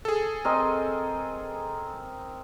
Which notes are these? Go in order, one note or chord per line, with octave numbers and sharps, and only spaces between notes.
G#4 A4
C4 A#4 D#5